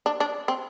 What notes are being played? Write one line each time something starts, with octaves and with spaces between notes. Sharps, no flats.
D4
D4
C4